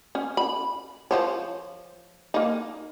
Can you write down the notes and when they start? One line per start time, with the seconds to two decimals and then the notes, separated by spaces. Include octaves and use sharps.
0.15 C#4
0.37 B5
1.11 F3 C5 C#5
2.34 A#3 D#4